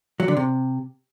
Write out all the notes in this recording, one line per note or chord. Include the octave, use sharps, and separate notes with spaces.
F#3
D3
C3